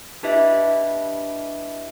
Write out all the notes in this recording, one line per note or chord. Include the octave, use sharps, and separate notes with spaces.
D4 E4 G4 B4 D#5 E5